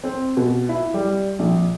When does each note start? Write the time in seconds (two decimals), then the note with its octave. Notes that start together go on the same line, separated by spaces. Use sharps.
0.04 C4
0.37 B2
0.69 E4
0.94 G3
1.39 A#1